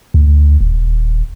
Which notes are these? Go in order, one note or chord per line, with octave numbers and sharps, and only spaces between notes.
D2
D#1